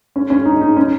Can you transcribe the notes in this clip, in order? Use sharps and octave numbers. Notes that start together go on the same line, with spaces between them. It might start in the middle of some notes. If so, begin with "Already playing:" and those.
C#4
C#4
D#4
D#4
C#4